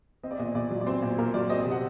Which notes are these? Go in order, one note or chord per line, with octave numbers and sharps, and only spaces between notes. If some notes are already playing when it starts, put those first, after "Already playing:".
C4 D#5
D5
A#2 D#5
A#2 D5
F#3
D5
C4 C5
A#2
A#2 A#4
F#3 D5
C4 D#5
D#5
C3
F#5